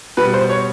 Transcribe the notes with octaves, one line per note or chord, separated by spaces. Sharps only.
B2 G3 B3 B4
C5
C#5